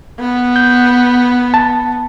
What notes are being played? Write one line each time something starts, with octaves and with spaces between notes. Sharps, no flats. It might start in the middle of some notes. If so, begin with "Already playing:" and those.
B3
G6
A5